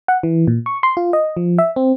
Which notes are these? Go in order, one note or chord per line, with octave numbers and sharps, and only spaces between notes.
F#5
E3
A#2
C#6
C6
F4
D#5
F3
E5
C4